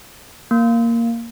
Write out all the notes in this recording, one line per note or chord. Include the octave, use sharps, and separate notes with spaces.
A#3